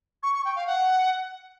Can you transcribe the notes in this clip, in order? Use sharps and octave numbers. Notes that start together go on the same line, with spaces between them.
C#6
C#6
G5
F5
F#5